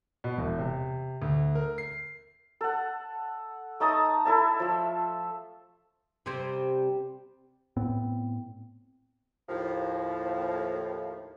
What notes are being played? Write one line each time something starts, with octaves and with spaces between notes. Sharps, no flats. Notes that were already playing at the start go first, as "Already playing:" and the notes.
B2
E1
C3
D2
A#4
C7
A4 F#5
A3 D#4 A5 D#6
E4 A4 E5 A5
F3 E5
C3 G3 C4
A2 B3 C4
D#2 A2 F3